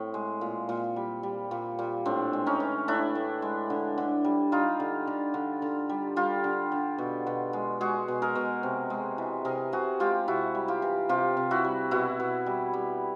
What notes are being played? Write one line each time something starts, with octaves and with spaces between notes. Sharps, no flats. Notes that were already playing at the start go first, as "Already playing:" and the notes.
Already playing: A2 C4
G#3
A#2
A#2
G3
G3
A#2
A#2
A2 C4 D4
G#3
C#4 D#4
E3
A2 D4 E4
A2
G#3
D3
D3
G3
G3 D#4 F4
D3
D3
D3
D3
G3
G3 F4 G4
D3
D3
B2
B2
G#3
G#3 F#4 G#4
B2
G#4 A#4
B2
C3
G#3
E3
C3 G#4 A#4
C3 F#4 G#4
G#3 F4 G4
C3 E4 F#4
G3
F4 G4
E3
C3 F4 G4
C3
E4 F#4
G3
B2 E4 F#4
B2
G3
G3